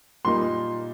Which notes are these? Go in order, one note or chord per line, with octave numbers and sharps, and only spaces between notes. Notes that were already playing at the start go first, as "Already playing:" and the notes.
A#2 G3 A#3 D#4 C6